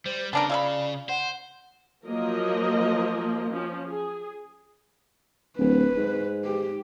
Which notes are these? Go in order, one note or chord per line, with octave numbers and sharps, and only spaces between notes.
G3 C5
C#3 B3 D4 A#4 A5
F4 D5 E5 B5
C5 F#5
F3 F#3 A#3 A#4 D#5
F3 C#4
G#4
D1 B4
G#2
G4